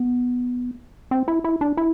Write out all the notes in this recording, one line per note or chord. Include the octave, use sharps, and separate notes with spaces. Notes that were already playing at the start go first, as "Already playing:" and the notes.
Already playing: B3
C4
E4
E4
D4
E4